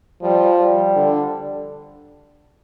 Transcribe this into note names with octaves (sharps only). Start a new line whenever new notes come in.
F3 G3
G3
D3